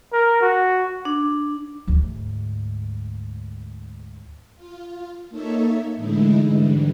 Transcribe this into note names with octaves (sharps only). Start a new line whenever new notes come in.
A#4
F#4
D4
D2 G#2
F4
A#3 D#4 A4 C#5 E5
A2 D3 E3 G#3 D#4 E4
G#2 D3 E3 G3